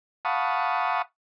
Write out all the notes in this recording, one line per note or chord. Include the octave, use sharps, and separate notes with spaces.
F5 F#5 A5 B5 C#6 D#6